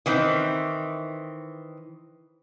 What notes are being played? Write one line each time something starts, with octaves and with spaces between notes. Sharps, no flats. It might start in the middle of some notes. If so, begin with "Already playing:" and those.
D#3 E3 C4